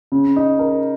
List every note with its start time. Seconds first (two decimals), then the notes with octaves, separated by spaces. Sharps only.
0.12 C#3
0.36 D#4
0.59 A#4